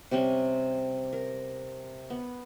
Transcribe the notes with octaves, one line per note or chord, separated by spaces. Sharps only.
C3 G3 C4 C#4
A#4
B3